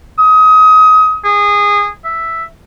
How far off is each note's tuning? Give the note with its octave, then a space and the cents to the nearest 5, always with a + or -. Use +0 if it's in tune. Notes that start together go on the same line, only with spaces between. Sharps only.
D#6 +25
G#4 -20
E5 +0